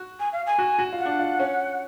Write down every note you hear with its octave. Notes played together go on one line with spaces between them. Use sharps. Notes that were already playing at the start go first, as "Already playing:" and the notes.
Already playing: F#4
G#5
F5
G#5
F#4
F#4
F4
F#5
D4
F4
C#4